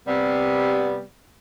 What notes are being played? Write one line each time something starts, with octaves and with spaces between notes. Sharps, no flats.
C3 G3 B3